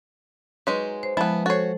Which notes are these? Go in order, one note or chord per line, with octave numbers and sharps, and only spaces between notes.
F#3 G#3 D#4 B4
C5
F3 G#3 B3 E4 A5
F#4 A4 C5 C#5